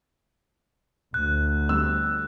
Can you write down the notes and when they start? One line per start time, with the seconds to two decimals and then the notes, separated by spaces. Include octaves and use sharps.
1.14 D2 F#6
1.69 G3 E6